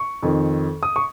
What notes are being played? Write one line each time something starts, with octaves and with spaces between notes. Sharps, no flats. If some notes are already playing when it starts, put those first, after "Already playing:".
Already playing: C#6
F2 D#3
D#6
C#6